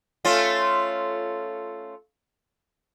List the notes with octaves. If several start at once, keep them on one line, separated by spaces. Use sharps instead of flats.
A3 C#4 F4